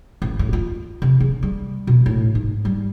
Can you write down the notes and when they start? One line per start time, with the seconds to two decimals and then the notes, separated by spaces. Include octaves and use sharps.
0.22 A1
0.39 A2
0.53 F4
1.02 C3
1.20 C#3
1.43 G3
1.87 B2
2.06 A2
2.35 G#2
2.65 G3